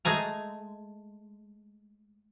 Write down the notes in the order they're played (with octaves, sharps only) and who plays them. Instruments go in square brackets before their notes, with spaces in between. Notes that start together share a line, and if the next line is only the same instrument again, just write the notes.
[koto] G#3 A3 G#5 A#5